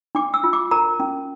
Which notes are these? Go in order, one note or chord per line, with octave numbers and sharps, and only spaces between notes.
D4 D6
E6
F4
D6
A#4 A#5
C#4